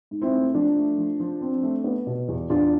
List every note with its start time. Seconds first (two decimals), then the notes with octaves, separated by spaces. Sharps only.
0.11 G#2
0.22 C4 E4
0.33 A3
0.54 F3 D4
0.76 A3
0.98 F3
1.20 F3
1.41 C4
1.63 A3
1.84 B3
2.07 B2
2.28 E2
2.50 E2 D4 F4